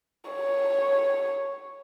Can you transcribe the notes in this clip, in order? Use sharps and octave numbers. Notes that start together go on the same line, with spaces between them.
C#5